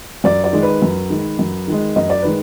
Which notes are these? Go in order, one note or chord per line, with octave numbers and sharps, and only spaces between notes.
F#2 D5
D5
D#3 G#3
B4
F#2
D#3 G#3
F#2
D#3 G#3
F#2 D#5
D5
D#3 G#3 B4